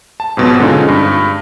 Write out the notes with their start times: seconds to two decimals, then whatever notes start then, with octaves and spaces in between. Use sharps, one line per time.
0.20 A5
0.37 F2 G#2 B2 F#3 C4
0.60 D3 G#3 C4 C#4 D#4 F4
0.88 G2